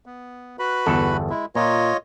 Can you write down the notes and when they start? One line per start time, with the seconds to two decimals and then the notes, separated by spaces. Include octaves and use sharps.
0.06 B3
0.59 F#4 B4 B5
0.86 G1 E2 A4
1.30 G#3 E4
1.55 A#2 F4 C#5 D#5